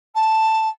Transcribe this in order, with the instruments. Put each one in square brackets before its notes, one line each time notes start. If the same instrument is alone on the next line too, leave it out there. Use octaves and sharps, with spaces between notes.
[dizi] A5